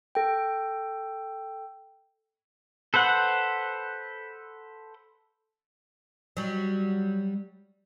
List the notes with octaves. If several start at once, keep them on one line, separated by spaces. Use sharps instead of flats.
A4 G5
A4 B4 C5 F#5
F#3 G3